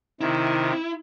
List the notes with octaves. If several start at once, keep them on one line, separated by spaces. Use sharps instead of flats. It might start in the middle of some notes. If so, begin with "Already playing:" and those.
C3 D#3 E4